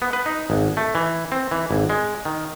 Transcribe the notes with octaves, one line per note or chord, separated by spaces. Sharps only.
B3
B4
D#4
G#1
A3
E3
C4
E3
G#1
G#3
D#3